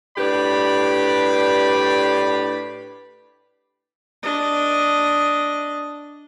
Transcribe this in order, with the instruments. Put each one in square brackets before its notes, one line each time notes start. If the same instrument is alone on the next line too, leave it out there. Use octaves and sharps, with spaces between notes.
[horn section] A2 D4 G4 B4 D5 B5
[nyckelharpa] D4 D#5